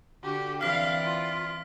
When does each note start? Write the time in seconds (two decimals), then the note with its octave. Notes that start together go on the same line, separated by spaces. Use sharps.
0.23 D3 F#4 G4
0.61 E3 C4 D5 F5 F6 B6
1.03 F4